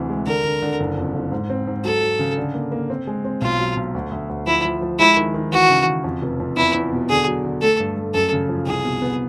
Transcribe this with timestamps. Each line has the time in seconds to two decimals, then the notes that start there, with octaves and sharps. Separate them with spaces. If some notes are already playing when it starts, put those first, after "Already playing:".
Already playing: D2 C3 E3
0.09 G#3
0.27 D3 A#4
0.44 D3
0.62 D3
0.80 F#1
0.97 F2
1.14 F#1
1.32 G#2
1.50 C4
1.67 G#2
1.84 F#3 A4
2.01 F#3
2.19 C#3
2.37 D3
2.55 A#3
2.72 A#3
2.90 C4
3.07 G#3
3.25 C4
3.41 B1 F4
3.59 F#3
3.77 B1
3.95 D2
4.11 D2
4.29 D2
4.47 F3 E4
4.64 F3
4.82 F3
4.99 G#3 E4
5.17 D#3
5.34 D#3
5.52 E3 F#4
5.70 C#3
5.87 C#3
6.04 F2
6.22 F1
6.40 F2
6.57 E2 E4
6.74 E2
6.92 B2
7.09 D3 G#4
7.27 F#3
7.45 D3
7.62 A3 A4
7.80 G2
7.97 A3
8.14 F#2 A4
8.32 C#3
8.49 F3
8.67 C2 G#4
8.84 B2
9.02 B3